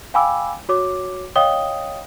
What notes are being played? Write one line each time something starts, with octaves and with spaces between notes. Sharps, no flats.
F5 G5 G#5 B5 D6 E6
F#4 C#5 D6
C#5 D#5 F5 G5 D#6 G7